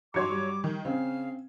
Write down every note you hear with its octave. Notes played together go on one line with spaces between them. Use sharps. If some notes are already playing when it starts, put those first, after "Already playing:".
G2 F#3 C#5 C6 D6 G#6 C#7
G3
D#3
C#3 C4 F5